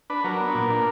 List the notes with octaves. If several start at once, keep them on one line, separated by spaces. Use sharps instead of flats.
D4 B4
F#3 A#4
B3
A#2
D4